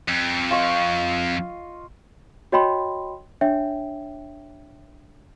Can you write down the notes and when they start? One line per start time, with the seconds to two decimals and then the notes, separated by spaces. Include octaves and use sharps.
0.08 F2
0.51 F4 D#5 C#6
2.52 F#4 C#5 D#5 G5 B5 C6
3.41 D4 C#5 E5 G5